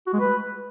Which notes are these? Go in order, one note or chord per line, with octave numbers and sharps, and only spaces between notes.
F#4
G#3
B4